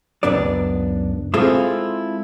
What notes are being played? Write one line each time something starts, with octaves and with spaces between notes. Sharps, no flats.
C#2 F#2 B3 D4 D5
G#3 C4 E4 F4 G#4 A4